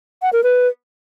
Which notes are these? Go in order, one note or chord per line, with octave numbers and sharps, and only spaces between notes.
F#5
A#4
B4